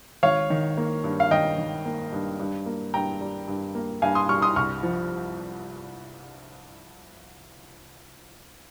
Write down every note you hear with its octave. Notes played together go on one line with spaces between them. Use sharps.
G#1 C#5 F5
D#3
A#3
G2
F5
G#1 D#5 G5
D#3
A#3
G2
G2
A#3
G2 G5 A#5
G3
G2
A#3
G2 F5 G#5
C6 D#6
G3 C#6 F6
C6 D#6
C2 C#6 F6
F3